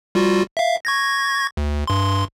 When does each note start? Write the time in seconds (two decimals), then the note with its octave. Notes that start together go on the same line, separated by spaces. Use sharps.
0.15 G3 F4 F#4
0.57 E5 F5
0.85 C#6 G#6 A#6
1.57 D2
1.87 G2 C6